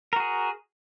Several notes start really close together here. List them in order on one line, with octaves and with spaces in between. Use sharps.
A#4 F#4 G#4